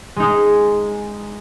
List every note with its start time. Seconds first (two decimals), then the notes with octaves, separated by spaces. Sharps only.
0.16 G#3 D#4